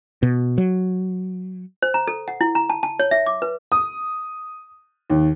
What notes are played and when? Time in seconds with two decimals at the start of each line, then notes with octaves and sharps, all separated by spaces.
0.23 B2
0.58 F#3
1.82 C5
1.94 A#5
2.08 A4
2.28 F#5
2.41 E4
2.55 A#5
2.70 A5
2.83 A5
2.99 C#5
3.11 E5
3.26 D6
3.42 B4
3.72 D#6
5.10 D#2